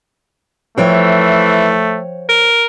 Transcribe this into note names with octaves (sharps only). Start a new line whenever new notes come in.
E3 F3 A3 C#5 G5
A#4